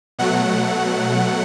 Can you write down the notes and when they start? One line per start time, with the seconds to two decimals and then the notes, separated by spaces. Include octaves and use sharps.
0.19 B2 F#3 A3 F#5